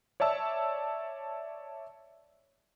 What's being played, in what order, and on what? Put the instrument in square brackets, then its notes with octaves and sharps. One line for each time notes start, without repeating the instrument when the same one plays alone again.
[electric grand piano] C#5 D5 E5 A5 E6